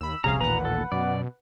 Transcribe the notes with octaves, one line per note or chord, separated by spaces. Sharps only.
D#2 B5 E6
D#1 C2 F2 C3 C#4 G#4 F5 A#5
A1 D#2 A#2 B4 F#5 A#5
A4
F#2 B2 D5